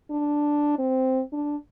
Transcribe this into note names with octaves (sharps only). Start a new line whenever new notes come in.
D4
C4
D4